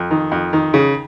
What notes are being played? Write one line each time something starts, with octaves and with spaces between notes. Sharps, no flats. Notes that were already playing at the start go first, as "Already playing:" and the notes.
Already playing: F2
D#3
F2
D#3
C#3